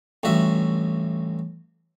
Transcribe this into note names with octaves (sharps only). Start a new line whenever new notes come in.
A1 G2 F#4 E5